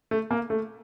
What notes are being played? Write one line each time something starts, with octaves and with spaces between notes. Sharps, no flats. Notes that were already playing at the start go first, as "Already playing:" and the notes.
A3
A#3
A3